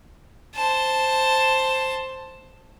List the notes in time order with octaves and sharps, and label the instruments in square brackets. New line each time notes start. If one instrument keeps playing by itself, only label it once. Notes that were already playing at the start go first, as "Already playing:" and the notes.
[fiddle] C5 A5